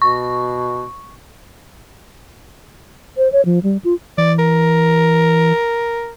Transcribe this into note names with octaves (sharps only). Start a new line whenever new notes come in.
B2 C#6
C5
C#5
F3
G3
F4
E3 D5
A#4